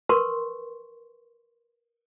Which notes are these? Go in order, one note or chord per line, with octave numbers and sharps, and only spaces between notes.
A#4 B4 C6 C#6